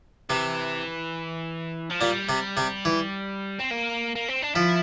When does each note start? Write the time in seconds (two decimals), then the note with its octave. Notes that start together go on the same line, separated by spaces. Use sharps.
0.30 C3 E3
1.90 F3
2.00 A#2 G3
2.29 C3
2.57 C3
2.85 E3
3.59 C4
3.70 A#3
4.16 A#3
4.29 C4
4.42 D4
4.55 F3 E4